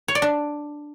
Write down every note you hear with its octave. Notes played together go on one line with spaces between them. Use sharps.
C#5
D5
D4